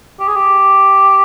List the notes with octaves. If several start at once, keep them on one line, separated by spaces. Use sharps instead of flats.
G4
G#4
G4